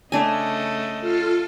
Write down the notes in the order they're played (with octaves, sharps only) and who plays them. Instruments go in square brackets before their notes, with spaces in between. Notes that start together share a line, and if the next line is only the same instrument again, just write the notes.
[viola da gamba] C#3 A3 D#5 [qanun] D4 G#5
[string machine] F4 A4 F6